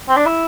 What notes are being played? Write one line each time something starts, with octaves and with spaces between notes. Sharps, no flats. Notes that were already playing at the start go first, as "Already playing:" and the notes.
C4
D4
E4